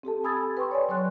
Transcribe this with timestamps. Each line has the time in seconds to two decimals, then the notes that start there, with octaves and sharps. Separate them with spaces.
0.03 C4 G4 A4 A5
0.24 G#5 B5 D#6 E6 G#6 A6
0.57 B4 G5 C6 C#6
0.71 C#5 D5 G#5
0.89 F#3 B4 C#5 C6 F#6